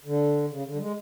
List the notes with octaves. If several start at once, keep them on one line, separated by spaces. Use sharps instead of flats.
D3
C#3
D3
G3
G#3